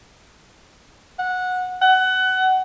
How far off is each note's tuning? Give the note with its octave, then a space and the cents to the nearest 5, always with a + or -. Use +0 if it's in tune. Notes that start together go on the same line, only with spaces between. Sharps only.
F#5 -15
F#5 +20